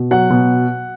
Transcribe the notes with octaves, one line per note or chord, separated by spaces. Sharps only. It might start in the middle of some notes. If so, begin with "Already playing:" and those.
Already playing: B2
F#3 F#5
B2